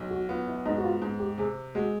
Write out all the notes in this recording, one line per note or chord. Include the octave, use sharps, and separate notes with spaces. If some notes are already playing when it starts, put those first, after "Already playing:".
Already playing: B1
F#4
B3 F4
E4
G#2 D#4
F#4
F4
G#2
G4
C3 G#4
G#3 F#4